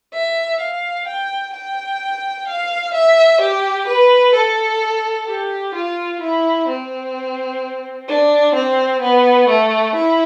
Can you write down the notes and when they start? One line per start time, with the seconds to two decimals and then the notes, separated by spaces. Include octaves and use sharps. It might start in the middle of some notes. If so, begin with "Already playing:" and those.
0.13 E5
0.60 F5
1.07 G5
1.53 G5
2.47 F5
2.94 E5
3.41 G4
3.87 B4
4.34 A4
5.27 G4
5.74 F4
6.21 E4
6.68 C4
8.08 D4
8.55 C4
9.02 B3
9.48 A3
9.95 E4